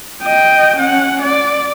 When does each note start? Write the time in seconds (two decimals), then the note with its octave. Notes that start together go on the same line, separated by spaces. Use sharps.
0.22 D#5 G5
0.77 C#4 F#5
1.22 D5